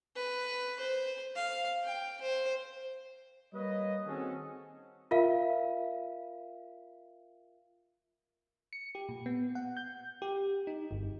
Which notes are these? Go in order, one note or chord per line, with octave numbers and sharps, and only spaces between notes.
B4
C5
F5
G5
C5
G3 A#3 B4 C#5 D#5
D#3 C4 C#4 F#4 G#4 A4
F4 A#4 E5 F5
C#7
G4
A#2
B3
F#5
G6
G4
D#4
G1